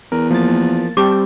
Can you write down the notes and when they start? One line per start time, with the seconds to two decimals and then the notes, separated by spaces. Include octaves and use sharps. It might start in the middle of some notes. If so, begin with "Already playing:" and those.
0.12 E2 A#4
0.31 F3 A#3 A6
0.97 G3 C4 G4 G5 A5 D6